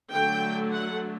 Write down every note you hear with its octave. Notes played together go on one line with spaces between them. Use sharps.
D3 F#3 A3 G5
F#5